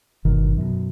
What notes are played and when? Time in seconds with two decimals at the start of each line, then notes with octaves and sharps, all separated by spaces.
0.25 G1 B2 D#3
0.57 F#2 B2